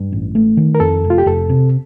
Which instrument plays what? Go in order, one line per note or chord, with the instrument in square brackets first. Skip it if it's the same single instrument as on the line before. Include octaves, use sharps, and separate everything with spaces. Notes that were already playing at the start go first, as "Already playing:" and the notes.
Already playing: [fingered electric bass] G2
A1
A3
D#3
[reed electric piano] A#4
[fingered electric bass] F2 [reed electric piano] A4
[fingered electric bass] F1
[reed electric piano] F4
G4
[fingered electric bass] F1 [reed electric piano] A4
[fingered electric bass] C3